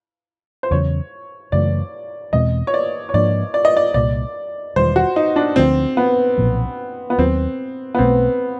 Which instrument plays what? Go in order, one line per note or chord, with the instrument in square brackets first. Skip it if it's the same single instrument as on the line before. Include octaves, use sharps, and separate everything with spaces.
[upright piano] C5
[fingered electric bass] E2 C#3 F#3 [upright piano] C#5
[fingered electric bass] F#2 C#3 E3 A3 [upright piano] D5
[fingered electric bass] E2 B2 G#3 C4 [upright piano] D#5
[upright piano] C#5
D5
C#5
[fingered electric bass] G#2 F3 A#3 D4 [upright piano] D5
[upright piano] D5
D#5
D5
[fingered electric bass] C2 A#2 G3 [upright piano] D5
[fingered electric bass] E1 D#2 D#3 G3 [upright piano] C5
[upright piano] F#4
D#4
D4
[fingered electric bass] D2 D3 F3 A3 [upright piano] C4
[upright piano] B3
[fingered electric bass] B1 A#2 F3 A#3
[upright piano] B3
[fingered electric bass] D#2 D#3 F#3 [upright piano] C4
[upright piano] B3
[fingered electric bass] B1 B2 F#3 A3 [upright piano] C4